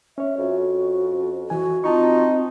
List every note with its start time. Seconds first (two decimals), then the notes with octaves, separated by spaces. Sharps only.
0.18 C#4 C#5 E5
0.39 F2 F#4
1.50 E3 F#4 G#5
1.84 C4 D#4 F4 A5 A#5 C#6